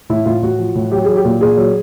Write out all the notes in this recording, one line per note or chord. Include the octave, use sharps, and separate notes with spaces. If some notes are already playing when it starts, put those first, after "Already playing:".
A2 E4
A2 F4
A2 F#4
F3
A2
F#3 G4
F#3 G#4
G4
A#2
A#2 G#4
F#3